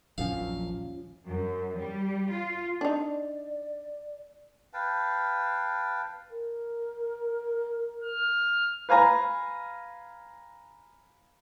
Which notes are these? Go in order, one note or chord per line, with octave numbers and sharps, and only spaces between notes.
D#1 A#1 F#2 F3 C#4 F5
F#2
G3
F4
D4 D#4 D5
B4 F5 G5 A5
A#4
F6
B4 F5 G#5 A#5